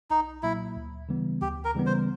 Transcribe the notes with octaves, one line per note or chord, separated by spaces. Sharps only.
B1 D#4
A#2 F#3 A#3 E4
D2
C#3 E3 G3 B3
D2 G4
A#4
C#3 E3 G3 B3
C5